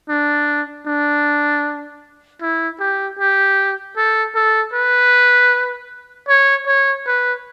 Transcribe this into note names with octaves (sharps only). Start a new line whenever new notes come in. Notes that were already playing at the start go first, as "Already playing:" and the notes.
D4
D4
E4
G4
G4
A4
A4
B4
C#5
C#5
B4